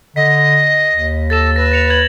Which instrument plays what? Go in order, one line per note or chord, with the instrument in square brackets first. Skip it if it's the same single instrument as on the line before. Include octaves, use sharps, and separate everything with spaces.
[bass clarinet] D3 [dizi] D#5 [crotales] B6
[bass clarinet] D#2
[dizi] A4 [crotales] A6 A#6 E7
[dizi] B4 [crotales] A#6
[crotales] A#6 C#7 F7
G#6 F#7